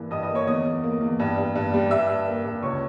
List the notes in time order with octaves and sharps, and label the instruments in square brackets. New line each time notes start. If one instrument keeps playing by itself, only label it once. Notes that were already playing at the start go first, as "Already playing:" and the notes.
Already playing: [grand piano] G2 E3 A#3
G2 D#5 D#6
D#5 D#6
A#3
C#5 C#6
E2 D#5 D#6
E2
A#3
E2
G2
G2
G2
G3
G2 E5 E6
G2
A#3
G2
C#2 C#5 C#6